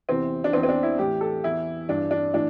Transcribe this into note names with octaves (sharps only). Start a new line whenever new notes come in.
E2 C3 E3 C4
D4
E2 E3 C4
C4
D4
E4
A2 E3 G4
A4
E2 E3 E4
G2 E3 D4
D4
A2 E3 D4